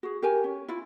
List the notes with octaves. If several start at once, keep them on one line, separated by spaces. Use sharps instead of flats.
F#4 G#4
G4 A#4 G#5
C#4
E4 F4